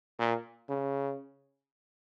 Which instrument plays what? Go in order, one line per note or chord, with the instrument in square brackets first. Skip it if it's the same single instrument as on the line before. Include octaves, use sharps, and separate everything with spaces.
[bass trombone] A#2
C#3